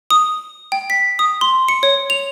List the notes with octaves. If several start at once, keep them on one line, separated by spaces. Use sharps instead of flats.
D#6
G5
B6
D#6
C6
C#7
C#5
F7